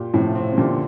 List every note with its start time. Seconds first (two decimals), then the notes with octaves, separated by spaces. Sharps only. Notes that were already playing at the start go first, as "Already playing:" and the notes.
Already playing: A#2 G4
0.13 A2 C3 F3
0.35 C4
0.53 C3
0.57 A#2 D3 G4